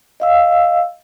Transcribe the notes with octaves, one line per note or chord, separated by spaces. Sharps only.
D#5 F5 E6